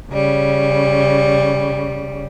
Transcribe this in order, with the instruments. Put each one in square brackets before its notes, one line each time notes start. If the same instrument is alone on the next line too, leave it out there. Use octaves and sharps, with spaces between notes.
[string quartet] C#3 G3